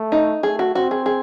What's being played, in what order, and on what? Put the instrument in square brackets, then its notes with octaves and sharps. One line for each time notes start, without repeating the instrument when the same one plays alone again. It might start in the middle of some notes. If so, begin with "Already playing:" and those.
Already playing: [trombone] A3
[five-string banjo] D#4
[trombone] A3 [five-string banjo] G#4
[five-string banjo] F#4
[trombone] C4 [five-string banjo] F#4
[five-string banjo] G#4
G#4